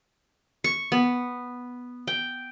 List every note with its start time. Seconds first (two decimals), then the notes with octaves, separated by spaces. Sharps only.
0.64 C#6
0.92 B3
2.07 G5